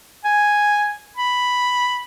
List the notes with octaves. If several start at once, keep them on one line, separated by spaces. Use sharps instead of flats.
G#5
B5